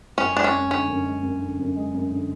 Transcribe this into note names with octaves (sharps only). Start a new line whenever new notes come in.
F#2 C#4
G#3 D4
C#4
F#2
D3 C#4
F#2
G#3
F#2
D3
F#2
G#3
F#2
D3